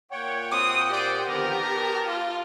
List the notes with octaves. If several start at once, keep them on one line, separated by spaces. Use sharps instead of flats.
A#2 C#5 F#5 G5
C4 D#6
G4 C5 D5
D3 D#3 F3 B3 A#4
A5
F4